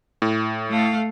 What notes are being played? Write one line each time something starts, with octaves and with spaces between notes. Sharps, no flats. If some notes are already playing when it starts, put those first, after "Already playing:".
A2
A3 F5